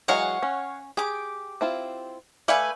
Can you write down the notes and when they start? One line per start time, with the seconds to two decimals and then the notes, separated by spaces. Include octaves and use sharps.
0.08 E3 F#3 G#3 C#5 F5 F#5
0.43 C#4
0.97 G4 G#4 D6
1.61 C4 E4 F4
2.48 A3 B4 D5 E5 F5 G#5